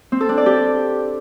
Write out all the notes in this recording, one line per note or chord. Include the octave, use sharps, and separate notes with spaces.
C4
A4
D4
D5
G4